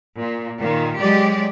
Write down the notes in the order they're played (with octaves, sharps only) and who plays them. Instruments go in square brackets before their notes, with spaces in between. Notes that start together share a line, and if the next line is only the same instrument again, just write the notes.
[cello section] A#2
A#2 D#3
F#3 G#3 G4 D5